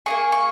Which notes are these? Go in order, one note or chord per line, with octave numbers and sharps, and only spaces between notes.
A#3 D#4 G#4 C#6
C#6